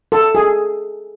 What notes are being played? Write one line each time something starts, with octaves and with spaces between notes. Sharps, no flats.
A4
G#4